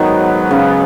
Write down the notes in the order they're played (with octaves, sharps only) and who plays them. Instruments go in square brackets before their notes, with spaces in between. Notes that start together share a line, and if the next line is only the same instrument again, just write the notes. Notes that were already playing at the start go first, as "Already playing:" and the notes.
Already playing: [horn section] G#2 F#3 B3 [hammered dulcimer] D#3
[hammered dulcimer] C#3